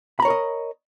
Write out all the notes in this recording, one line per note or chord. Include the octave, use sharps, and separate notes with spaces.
A#4 C#5 D#5 A#5 B5